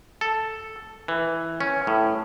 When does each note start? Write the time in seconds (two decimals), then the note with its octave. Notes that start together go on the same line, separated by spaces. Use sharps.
0.21 A4
1.08 E3
1.61 C#4
1.87 A2